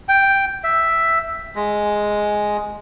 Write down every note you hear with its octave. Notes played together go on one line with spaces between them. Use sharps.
G5
E5
G#3